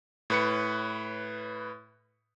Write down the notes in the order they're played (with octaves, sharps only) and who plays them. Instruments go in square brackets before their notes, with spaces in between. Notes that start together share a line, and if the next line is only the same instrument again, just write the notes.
[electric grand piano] A2 B4 C#7